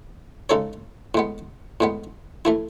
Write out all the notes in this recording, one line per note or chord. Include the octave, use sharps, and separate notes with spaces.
C#3 G#3 D#4 A4 C#5
A2 G#3 B3
A2 G#3 B3
E3 A3 E4